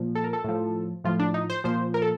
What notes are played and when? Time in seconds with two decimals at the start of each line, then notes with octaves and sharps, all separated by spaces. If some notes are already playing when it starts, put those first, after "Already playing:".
Already playing: A#2 F3
0.15 A4
0.24 A#4
0.33 A4
0.44 A2 F3
1.04 A2 F3 F4
1.19 D4
1.34 D#4
1.50 C5
1.64 A#2 F3 C5
1.94 A#4
2.02 A4